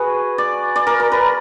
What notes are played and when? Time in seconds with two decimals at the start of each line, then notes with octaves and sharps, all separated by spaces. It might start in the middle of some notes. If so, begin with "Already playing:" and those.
Already playing: F#4 G#4 B4
0.38 D5
0.76 D5
0.87 A#4
1.00 A#4
1.12 B4